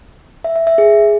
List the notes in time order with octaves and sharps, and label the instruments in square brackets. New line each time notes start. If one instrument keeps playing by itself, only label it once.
[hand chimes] E5
E5
E5
G#4